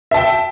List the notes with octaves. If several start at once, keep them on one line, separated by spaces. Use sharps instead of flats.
E5 G5 A5